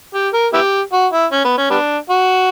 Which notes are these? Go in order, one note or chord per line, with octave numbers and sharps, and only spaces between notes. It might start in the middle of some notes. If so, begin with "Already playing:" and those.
G4
A#4
B3 E4 G4
F#4
E4
C#4
B3
C#4
G3 B3 D4
F#4